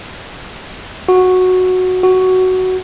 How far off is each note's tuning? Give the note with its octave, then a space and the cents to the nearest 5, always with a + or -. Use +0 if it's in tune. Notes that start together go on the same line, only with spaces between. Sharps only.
F#4 -5
F#4 +10